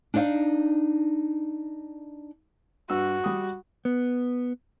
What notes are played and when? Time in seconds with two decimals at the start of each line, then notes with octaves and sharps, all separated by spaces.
0.14 D4 D#4 D5 F5
2.90 G2 F#4 E6
3.24 G3 D#6
3.85 B3